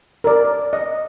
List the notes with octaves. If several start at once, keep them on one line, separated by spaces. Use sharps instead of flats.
A#4 D5
D#5